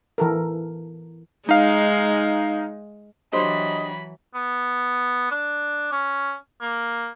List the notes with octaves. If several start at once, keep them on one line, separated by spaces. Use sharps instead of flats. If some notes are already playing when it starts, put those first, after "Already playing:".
E3 A4 A#4
G#3 D#4 F5
E3 F#3 D4 G4 C5 D#5 B5
B3
D4
C#4
A#3